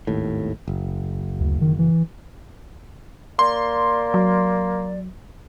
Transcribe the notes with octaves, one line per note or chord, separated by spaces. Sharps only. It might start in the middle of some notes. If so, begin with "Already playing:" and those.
G#1 D#2 A2
F#1
D2
D#3
E3
A#3 D5 C6
F#3